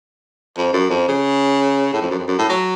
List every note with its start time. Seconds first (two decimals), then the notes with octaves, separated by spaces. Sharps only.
0.57 F2
0.73 F#2
0.90 F2
1.08 C#3
1.93 A2
2.02 F2
2.10 F#2
2.19 F2
2.28 F#2
2.39 A2
2.50 F#3